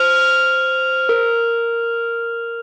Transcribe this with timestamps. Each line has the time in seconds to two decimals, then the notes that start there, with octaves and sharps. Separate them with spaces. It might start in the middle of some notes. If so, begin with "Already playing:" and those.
Already playing: C5 F6 F7
1.09 A#4